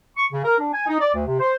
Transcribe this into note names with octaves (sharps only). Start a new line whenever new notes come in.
C#6
C#3
A#4
D4
G#5
D#4
D5
D2
C3
C5